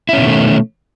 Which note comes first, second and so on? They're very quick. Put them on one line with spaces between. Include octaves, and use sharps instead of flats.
E4 C#4 B2 D#3 A3